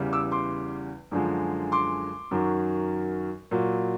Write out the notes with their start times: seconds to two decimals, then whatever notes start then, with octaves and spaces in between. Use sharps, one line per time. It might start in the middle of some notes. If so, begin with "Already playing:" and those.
Already playing: E2 C#3 E3 G3
0.13 D6 E6
0.32 C6 D6
1.11 F#2 D3 F3 G#3
1.72 C6 D6
2.31 F#2 D#3 F#3
3.51 A#2 F#3